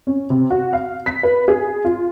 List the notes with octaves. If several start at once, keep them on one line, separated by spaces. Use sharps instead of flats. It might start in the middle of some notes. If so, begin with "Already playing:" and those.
C#4
C3
F#4
F5
B6
B4
G#4
F4